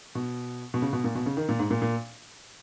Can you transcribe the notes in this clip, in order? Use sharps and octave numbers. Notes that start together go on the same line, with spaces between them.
B2
B2
C#3
B2
A#2
B2
C#3
D#3
A#2
G#2
A#2
A#2